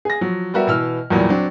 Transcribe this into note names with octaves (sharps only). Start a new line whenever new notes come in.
G#4 A#6
F3 F#3
G3 B3 F#4 A#4 E5
B2 E3 E6 F6
E2 A#2 F#3 G3
F#3 C4 D4